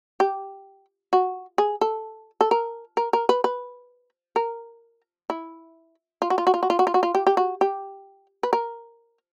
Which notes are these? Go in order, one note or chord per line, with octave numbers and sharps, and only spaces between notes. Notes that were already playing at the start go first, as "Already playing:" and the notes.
G4
F#4
G#4
A4
A4
A#4
A#4
A#4
B4
B4
A#4
E4
F4
F#4
F4
F#4
F4
F#4
F4
F#4
F4
F#4
F4
G4
G4
F#4
G4
B4
A#4